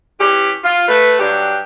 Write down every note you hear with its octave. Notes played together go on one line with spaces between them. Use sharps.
E3 C#4 G4
F4
A3 B4
G2 F#3 D4 G4